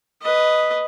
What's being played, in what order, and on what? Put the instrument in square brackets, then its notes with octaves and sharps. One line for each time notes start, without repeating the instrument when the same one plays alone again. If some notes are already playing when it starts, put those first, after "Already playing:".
[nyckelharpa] B4 D#5